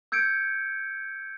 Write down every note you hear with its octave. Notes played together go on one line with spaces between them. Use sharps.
E6 G6 G#6 C#7 D7